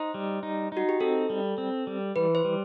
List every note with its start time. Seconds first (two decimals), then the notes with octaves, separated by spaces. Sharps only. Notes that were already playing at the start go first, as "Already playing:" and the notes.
Already playing: D#4 C5
0.14 G3
0.43 D#4
0.72 D#4 F#4
0.89 G4
1.00 C4 A4
1.30 G3
1.58 C4
1.87 G3
2.16 E3 B4
2.35 C5
2.45 G3